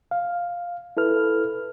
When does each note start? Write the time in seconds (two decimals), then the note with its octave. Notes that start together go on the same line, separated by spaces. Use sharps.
0.11 F5
0.97 E4 A4 B4 F6